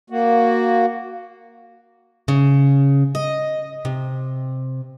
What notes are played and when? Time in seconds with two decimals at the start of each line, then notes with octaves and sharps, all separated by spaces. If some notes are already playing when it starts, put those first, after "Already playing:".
0.10 A#3 F#4
2.28 C#3
3.15 D#5
3.85 C3